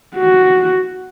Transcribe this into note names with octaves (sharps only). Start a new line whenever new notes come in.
F#4